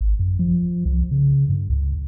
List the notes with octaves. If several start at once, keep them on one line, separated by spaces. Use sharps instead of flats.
G#1
F#2
F3
C2
C#3
G2
C#2